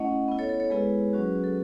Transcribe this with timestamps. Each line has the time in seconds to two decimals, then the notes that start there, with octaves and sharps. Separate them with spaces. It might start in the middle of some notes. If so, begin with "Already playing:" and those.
Already playing: A3 C#4 E4 D#5 F#5
0.28 B3 E4
0.39 A4 C#5
0.49 A4 C#5
0.60 A4 C#5
0.70 G#3 B3 E4 G#4 B4
1.13 F#3 C#4 F#4
1.44 A4